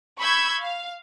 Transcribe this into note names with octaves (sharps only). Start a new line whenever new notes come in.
B5 C#6 E6 G6 G#6
F5